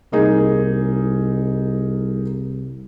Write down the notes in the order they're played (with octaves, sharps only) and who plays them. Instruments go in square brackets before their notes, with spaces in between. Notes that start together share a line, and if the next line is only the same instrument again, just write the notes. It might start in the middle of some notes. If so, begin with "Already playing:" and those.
[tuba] C2 [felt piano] A#3 D#4 G#4